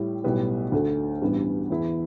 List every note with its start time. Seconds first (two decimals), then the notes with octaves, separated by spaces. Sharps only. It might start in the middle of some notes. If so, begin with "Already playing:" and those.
Already playing: A2 G3 E4
0.24 B1 A2 G3 B3
0.72 D2 D3 A3
1.22 A1 G2 G3 B3
1.70 E2 E3 B3 E4